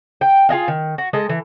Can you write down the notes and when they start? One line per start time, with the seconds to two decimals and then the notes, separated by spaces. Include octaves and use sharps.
0.21 G5
0.49 F4 G#4 D#5 F5
0.68 D#3
0.98 F#4
1.13 G#3 A4 D#5
1.29 E3